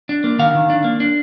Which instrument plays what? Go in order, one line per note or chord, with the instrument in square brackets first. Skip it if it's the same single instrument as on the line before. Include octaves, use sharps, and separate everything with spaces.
[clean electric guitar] D4
A#3
D#3 F5
D#3
D4
A#3
D4